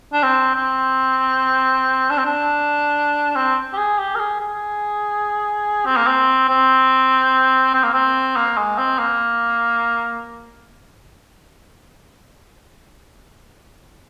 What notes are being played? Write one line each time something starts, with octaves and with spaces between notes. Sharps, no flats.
D4
C4
C4
D4
C4
D4
C4
G4
G#4
G4
A#4
G#4
G#4
C4
A#3
C4
C4
C4
A#3
C4
A#3
G#3
C4
A#3